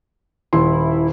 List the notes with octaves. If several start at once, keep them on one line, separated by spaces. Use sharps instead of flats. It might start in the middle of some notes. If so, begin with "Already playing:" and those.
D#1 E4 C6